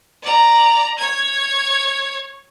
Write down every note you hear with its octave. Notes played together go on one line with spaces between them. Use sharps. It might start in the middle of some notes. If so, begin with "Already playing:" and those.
D5 A#5
C#5 G#6